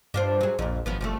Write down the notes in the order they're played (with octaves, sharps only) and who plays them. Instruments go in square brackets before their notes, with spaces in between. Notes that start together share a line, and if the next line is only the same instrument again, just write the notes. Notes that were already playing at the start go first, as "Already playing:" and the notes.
[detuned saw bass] G2 [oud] D4 F4 C5
[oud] F#3 G#4
[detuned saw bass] A#1 [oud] F2 A#2
[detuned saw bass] G#1 [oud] F#2 F3 B3
[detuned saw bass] F#1 [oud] F3 G3 A3